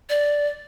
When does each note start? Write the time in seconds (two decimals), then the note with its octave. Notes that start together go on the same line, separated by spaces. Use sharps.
0.10 D5